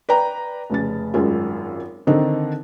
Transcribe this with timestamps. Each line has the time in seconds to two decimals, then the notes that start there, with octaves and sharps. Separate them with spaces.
0.09 B4 D5 G5 A#5
0.70 F1 C#3 A6
1.14 G#1 F#2 G#3 F4
2.07 D3 D#3 C4 D4 D#4